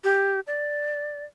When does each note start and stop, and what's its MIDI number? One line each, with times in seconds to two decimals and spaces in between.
0.04 0.40 67
0.47 1.25 74